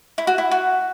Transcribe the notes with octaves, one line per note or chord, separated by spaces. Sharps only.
E4
F#4
E4
F#4